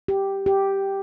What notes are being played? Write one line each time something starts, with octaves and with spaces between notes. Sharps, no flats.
G4
G4